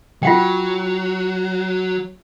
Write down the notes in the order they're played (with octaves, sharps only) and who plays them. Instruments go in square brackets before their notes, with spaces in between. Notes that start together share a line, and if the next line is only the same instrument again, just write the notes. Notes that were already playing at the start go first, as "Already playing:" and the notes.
[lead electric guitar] F#3 [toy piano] F4 F#5 G5